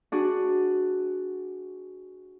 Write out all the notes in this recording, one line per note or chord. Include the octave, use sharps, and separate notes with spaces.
D4 F#4 G#4